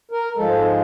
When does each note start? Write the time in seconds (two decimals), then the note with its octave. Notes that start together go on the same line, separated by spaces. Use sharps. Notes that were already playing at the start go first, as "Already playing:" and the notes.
0.11 A#4
0.37 G#2 F3 G#3 A4